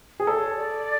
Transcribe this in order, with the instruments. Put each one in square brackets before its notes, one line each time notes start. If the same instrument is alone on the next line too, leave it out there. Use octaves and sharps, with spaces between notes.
[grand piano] G#4
[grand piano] A4 [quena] D5
[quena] C#5
D5